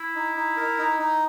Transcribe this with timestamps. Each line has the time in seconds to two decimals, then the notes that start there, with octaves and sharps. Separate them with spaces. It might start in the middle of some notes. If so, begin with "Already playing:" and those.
Already playing: E4
0.15 D#4
0.36 D#4
0.57 A#4
0.78 D#4
1.00 D#4